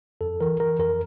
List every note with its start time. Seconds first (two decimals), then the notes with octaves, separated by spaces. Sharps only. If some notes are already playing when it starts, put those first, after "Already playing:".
0.21 F2 A4
0.41 E3 A#4
0.60 E3 A#4
0.79 F2 A#4